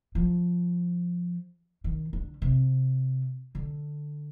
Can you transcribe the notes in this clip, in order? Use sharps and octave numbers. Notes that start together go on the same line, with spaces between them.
F3
D#3
D3
C3
D3